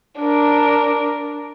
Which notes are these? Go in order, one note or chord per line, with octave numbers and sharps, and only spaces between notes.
D4 A#4